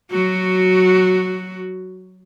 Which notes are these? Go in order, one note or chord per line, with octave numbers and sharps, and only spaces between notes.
F#3 F#4